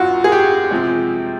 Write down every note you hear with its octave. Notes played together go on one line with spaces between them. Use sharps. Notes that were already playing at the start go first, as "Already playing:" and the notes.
Already playing: F#1 F#2 F#3 F4 F#4
G#4
G4
C3 F3 G#3